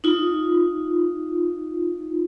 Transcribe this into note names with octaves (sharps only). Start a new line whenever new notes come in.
D#4 F4